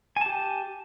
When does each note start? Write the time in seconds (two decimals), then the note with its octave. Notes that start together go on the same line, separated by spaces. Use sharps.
0.16 G#5
0.21 A5
0.26 G4